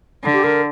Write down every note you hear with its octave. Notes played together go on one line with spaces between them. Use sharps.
D3
G4
A#4